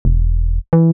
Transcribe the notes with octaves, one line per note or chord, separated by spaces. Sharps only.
E1
E3